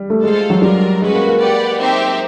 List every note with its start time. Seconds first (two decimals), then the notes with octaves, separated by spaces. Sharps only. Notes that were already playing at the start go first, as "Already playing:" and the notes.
Already playing: G3
0.10 A3
0.24 G#3 F4 A4 C5 F5
0.50 F#3
0.62 G3 D4 F4 A#4
1.00 G#3 C#4 F#4 B4
1.14 A#3
1.26 A#3
1.39 G4 B4 D5 F#5
1.79 C4 D#4 G4 C5 E5